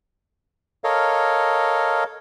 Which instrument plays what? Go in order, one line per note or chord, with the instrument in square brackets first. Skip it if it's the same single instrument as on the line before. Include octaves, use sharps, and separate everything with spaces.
[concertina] A4 A#4 C#5 D#5 F5